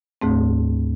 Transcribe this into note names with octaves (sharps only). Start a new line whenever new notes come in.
D2 G#2 A3 C4